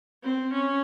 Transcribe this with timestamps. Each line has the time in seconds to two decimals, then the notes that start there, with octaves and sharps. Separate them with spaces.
0.23 C4
0.53 C#4